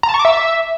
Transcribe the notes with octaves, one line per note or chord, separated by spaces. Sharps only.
A#5
A5
C#6
D6
E5